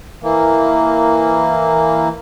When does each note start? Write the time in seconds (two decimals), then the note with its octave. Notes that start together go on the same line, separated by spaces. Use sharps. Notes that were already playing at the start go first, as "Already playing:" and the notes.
0.23 E3 A#3